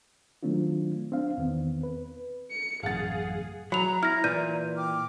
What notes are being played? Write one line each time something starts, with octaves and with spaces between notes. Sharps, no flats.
D#3 F#3 A3 C4 D4 F4
C4 D4 F5
E2 D#3 B3 C4
B4
C#7
A1 F#2 C#3 G#4 F5 F#5 A6
F#3 A#5 B5 F7
E4 F6 A#6
A#2 E3 D5 G6 D#7
G5 D6 F6